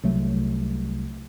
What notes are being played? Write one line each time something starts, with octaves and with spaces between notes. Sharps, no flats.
C2 F#3 A3